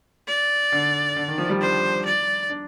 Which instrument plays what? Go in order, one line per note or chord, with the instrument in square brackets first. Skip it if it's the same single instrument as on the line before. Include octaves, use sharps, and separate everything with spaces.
[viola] D5
[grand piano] D3
D3
D#3
F3
G3
[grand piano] D4 [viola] C5
[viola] D5
[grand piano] D4